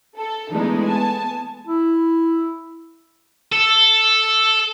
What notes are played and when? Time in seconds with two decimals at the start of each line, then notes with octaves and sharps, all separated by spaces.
0.16 A4
0.52 E3 G#3 A3 B3 D4 D#4
0.83 B3 G#5 A5
1.67 E4
3.53 A4